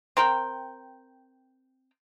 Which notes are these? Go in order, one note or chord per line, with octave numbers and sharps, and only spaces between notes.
C4 A#4 G5